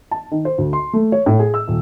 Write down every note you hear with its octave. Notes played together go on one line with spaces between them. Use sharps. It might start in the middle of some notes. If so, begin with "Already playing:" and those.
A5
D#3
C5
D2
C6
A3
C#5
A2
G#4
E6
D#1